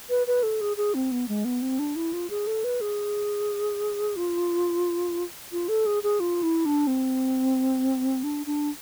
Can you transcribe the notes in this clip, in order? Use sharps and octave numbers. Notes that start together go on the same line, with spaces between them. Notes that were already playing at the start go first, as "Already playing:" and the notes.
B4
B4
A4
G#4
G#4
C4
B3
G#3
B3
C4
D4
E4
F4
G#4
A4
B4
G#4
F4
F4
A4
G#4
G#4
F4
E4
D4
C4
D4
D4